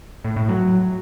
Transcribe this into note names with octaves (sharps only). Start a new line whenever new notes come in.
A2
A2
F#3